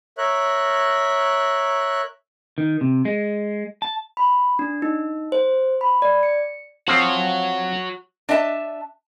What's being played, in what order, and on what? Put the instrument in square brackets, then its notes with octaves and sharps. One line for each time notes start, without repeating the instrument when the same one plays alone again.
[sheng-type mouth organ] A#4 C#5 E5 F#6
[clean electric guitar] D#3
C3
G#3
A5
[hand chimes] B5
D4
D#4
C5
B5
D5
C#7
[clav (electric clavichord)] F3 C4 F5 [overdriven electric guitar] F#4 C#5
[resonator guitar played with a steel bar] D4 D#5 E5 G5 A5